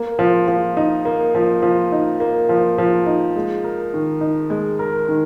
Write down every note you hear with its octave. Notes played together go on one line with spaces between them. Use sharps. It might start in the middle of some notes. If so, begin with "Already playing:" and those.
Already playing: A#3
F3
F3
D#4
A#3
F3
F3
D#4
A#3
F3
F3
D#4
G#3
A#4
D#3
D#4
G#3
A#4
D#3